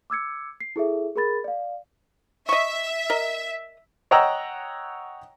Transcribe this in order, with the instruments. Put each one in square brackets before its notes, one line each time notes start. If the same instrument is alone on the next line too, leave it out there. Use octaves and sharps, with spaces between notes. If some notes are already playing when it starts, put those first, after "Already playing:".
[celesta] D6 E6 G#6 C#7
C7
E4 G#4 A4 E5
G#4 A#4 B5 A6
D5 F5
[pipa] D#5 C#6 [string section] E5
[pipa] A#4 D#5
[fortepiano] C#5 D#5 F#5 G5 A#5 E6